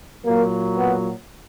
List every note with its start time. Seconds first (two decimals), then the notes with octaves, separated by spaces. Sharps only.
0.25 A#2 F#3 A#3
0.77 B3